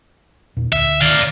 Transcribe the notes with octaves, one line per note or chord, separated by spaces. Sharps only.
E2 A#2
D2 E5
D#3 D5 F5